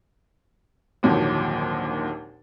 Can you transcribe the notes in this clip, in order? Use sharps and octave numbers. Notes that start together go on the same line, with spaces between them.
G#1 D#2 A#2 D3 F3 F#3